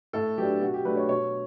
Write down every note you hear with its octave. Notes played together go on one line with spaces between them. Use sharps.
A2 A4
F#3 B3 D4 G4
B2 F#4
G4
F#3 A3 D4 B4
C#5
B2 C#5